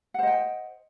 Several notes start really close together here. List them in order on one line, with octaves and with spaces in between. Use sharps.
F#5 C5 D#5 G5